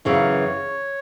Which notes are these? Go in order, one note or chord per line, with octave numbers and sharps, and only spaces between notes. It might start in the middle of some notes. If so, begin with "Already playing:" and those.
F#2 C#3 E3 C#5